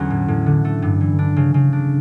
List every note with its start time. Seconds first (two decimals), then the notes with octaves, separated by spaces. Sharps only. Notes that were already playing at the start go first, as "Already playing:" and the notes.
Already playing: E2 D3 F#3 C#4
0.10 A2
0.28 A2
0.46 D3
0.65 A3
0.82 G2
1.01 E3
1.19 D4
1.36 C#3
1.54 C#3
1.73 D4